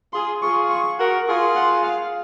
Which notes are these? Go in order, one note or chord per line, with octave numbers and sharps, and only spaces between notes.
F4 G#4 C6
F4 G#4 C#6
C#6
F#4 A#4
F4 G#4 C#6
F#5
F5